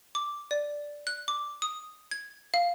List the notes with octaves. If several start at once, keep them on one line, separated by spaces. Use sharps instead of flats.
D6
D5
F#6
D6
D#6
G#6
F5